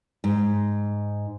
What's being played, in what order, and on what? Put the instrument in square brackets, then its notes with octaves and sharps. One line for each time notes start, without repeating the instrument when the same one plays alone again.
[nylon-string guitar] G#2